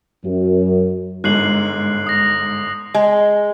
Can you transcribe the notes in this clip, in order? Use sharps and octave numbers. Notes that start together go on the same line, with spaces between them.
F#2
G1 G#2 F#6 C7 F#7
D#6 A#6
G#3